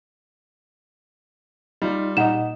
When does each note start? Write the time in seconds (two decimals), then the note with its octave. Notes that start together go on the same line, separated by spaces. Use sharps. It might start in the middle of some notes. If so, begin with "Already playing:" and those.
1.82 G3 D#4 F4
2.17 A#2 D#4 D#5 F#5 E7